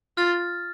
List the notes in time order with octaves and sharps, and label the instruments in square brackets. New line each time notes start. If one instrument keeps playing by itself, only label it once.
[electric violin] F4 [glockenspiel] F6 A6